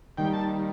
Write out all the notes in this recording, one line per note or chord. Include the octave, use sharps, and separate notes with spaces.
D#2 D#3 G3 G5
A5